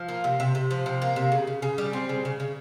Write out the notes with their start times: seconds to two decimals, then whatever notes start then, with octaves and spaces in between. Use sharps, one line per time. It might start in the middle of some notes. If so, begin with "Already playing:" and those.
Already playing: F3
0.09 A#3
0.24 C3
0.40 C3
0.55 C3
0.71 F3
0.86 C3
1.02 A#3
1.16 C3
1.32 C#3
1.47 C#3
1.62 C#3
1.78 G3
1.93 C4
2.09 C#3
2.25 C#3
2.40 C#3